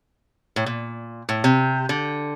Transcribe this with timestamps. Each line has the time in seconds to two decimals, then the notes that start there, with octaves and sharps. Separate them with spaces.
0.56 A2
0.66 A#2
1.29 A2
1.44 C3
1.89 D3